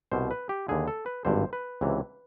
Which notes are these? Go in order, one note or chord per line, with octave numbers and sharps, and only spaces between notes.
C2 B2 C5
B4
G4
D#2 D3 G#4
A4
B4
G#1 G2 D3 C5
B4
C#2 C3 E3